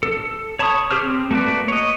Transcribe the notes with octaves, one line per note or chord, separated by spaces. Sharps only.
A4
C#5 A5 B5 C#6 D#6
G4 G#4 C5 F6
C4
A3 A#3 F#4 B4 D5
C#5 D#5